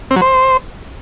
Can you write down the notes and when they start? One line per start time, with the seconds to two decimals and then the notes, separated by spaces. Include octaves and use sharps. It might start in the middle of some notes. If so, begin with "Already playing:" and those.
0.11 C4
0.16 F#3
0.22 C5